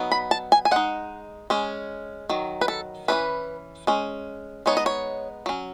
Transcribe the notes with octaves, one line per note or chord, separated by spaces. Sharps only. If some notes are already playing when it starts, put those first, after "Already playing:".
Already playing: F#3 B3 D#4
B5
A5
G#5
G#5
G#3 D#4 F#5
G#3 C#4
D#3 F#3
B4
A4
E3 A3 C#4 B4
G#3 C#4
G#3 B3 D#4 C#5
D#5
C#5
F#3 C#4